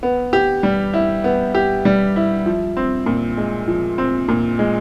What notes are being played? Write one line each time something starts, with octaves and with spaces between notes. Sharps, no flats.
B3
G4
G3
E4
B3
G4
G3
E4
F3
C4
A#2
G#3
F3
C4
A#2
G#3